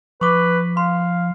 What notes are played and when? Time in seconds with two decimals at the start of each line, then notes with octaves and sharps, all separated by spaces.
0.21 F3 B4 C#6 D6
0.77 F5 C6